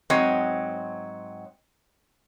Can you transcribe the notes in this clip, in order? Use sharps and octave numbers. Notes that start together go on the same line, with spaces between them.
G#2 F#3 C4 C#5 D#5